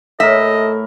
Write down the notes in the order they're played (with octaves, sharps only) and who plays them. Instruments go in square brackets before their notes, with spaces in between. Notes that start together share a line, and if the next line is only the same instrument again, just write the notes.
[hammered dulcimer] A2 A#4 [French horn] A4 [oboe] D#5 [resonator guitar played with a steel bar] E5